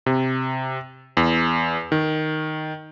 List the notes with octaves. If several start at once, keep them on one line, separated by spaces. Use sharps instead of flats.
C3
E2
D#3